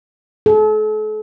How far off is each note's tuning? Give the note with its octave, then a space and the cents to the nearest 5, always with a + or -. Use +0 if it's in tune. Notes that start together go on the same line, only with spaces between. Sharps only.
A4 -40